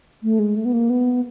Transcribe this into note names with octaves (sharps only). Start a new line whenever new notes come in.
A3
G#3
A3
B3
A#3
B3